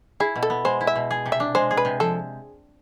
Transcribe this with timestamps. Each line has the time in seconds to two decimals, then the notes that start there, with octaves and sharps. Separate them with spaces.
0.20 E4 G#4
0.36 B2
0.43 A4
0.50 B3
0.65 G#3 C5
0.81 E4
0.87 E5
0.96 B2
1.11 G#4
1.26 C3
1.32 E5
1.40 D4
1.55 G#3 C5
1.71 G#4
1.77 B4
1.85 C3
2.00 F3 A4